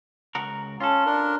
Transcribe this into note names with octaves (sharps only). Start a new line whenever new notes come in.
C#2 F#4 A#4
C#4 F4 A4
D4 A#4